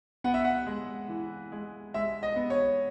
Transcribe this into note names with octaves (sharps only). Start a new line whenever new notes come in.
B3 F#5
E5
F#5
G#3
E3
G#3
G#3 E5
D#5
B3
C#5